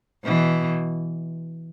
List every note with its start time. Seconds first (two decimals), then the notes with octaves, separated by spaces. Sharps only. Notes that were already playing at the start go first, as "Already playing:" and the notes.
0.25 B2 E3